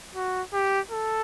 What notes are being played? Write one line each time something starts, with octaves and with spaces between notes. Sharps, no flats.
F#4
G4
A4